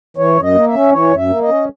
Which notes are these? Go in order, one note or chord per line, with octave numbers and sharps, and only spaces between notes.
E3 C#5
F#2
D#5
A#3
E5
C#4
E3 C#5
F#2
E5
A#3
D#5
C#4